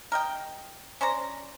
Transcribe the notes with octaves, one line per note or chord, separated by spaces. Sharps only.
A#4 D#5 G5
C#4 C5 D5 A#5